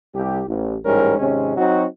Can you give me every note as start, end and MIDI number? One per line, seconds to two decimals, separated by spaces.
0.15 0.43 36
0.15 0.43 55
0.15 0.43 67
0.49 0.78 33
0.85 1.18 33
0.85 1.18 44
0.85 1.18 55
0.85 1.18 61
0.85 1.18 70
1.19 1.57 32
1.19 1.57 48
1.19 1.57 56
1.19 1.57 61
1.57 1.86 54
1.57 1.86 60
1.57 1.86 63
1.57 1.86 66